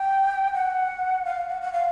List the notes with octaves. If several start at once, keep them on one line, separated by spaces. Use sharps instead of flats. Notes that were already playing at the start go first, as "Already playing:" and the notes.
Already playing: G5
F#5
F5
F#5
F#5
F5